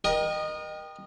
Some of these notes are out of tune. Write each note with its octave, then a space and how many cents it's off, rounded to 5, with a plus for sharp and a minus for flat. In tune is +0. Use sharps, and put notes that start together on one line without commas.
A#4 +30 D#5 -20 G5 +0